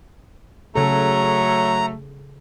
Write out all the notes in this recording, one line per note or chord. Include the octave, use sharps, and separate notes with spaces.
C#3 F#3 A3 A4 A#5